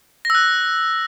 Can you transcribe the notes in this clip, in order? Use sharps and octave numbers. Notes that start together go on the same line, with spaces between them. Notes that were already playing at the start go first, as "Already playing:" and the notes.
E6 F#6 A#6